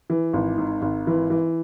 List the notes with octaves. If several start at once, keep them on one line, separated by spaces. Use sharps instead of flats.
E3
G#1
G#2
G#1
E3
E3